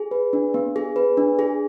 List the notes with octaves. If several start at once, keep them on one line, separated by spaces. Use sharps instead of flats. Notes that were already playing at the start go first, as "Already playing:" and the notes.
Already playing: G#4
B4
D4
B3
G#4
B4
D4
G#4